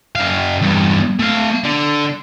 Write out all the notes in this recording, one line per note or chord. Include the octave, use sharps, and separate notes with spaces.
F#2 F5
E2 G2
A3 F5
D3